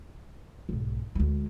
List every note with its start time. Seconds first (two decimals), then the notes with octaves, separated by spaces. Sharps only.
0.69 B1 G#2
1.15 D2 G#3